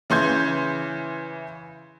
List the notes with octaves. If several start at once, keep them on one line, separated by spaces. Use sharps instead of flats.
C#3 E3 C6 G6 G#6